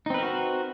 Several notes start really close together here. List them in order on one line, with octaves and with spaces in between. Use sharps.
D#4 C4 B4 A#4 F#4